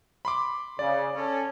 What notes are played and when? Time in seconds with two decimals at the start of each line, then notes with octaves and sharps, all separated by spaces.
0.25 B5 C6 D6
0.79 C#3 D5
1.15 C#4 A4